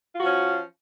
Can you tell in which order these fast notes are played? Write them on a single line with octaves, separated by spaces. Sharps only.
F4 F#4 F3 C#4